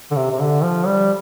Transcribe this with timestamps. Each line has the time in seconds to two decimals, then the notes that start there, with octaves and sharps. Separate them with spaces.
0.11 D3
0.16 C3
0.31 C3
0.40 D3
0.63 F3
0.86 G3